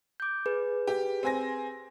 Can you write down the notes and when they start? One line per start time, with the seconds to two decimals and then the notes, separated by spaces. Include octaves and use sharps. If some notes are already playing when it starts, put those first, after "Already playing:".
0.20 D6 G6
0.46 G#4 B4
0.87 G4
1.23 C4 G#5 A#6